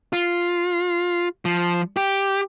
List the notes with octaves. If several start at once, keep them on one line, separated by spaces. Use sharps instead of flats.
F4
F3
G4